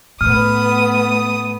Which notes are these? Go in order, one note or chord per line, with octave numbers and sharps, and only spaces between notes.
A2 A3 B3 D#6 F6